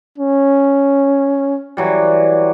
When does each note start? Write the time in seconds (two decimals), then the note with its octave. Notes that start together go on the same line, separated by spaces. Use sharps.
0.18 C#4
1.77 E3 F#3 G3